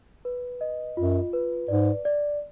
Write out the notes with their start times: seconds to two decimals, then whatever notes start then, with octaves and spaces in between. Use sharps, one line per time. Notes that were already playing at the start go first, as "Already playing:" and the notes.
0.25 B4
0.61 D#5
0.97 F#2 F4
1.33 B4
1.68 G#2 D5
2.05 D5